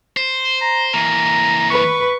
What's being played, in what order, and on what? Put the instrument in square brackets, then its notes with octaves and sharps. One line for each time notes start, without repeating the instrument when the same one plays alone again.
[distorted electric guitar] C5
[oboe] A#5
[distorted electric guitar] E3 A#3 [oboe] A#5
[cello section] B4 [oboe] C#6